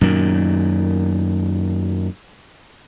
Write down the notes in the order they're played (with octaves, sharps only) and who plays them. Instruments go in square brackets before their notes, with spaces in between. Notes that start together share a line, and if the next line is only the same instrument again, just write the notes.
[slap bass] F#2 A#2 D#3